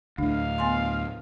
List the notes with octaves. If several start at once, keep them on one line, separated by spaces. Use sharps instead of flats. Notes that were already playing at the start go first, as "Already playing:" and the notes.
D2 A2 D4 F5
B3 G#5 C6